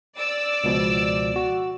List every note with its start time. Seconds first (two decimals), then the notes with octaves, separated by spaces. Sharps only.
0.17 D5 E6
0.64 C#2 B2 F3
1.36 F#4